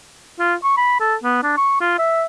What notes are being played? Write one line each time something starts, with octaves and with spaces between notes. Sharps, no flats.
F4
C#6
B5
A4
B3
D4
C#6
F4
E5